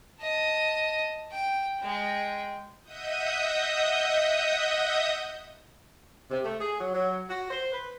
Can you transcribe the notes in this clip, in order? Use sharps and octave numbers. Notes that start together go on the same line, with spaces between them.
D#5 A5
G5
G#3 G5
D#5 E5 F#5 D#6 G6
C3
A3
G#4
F#3
F#3
F#4
C5
B4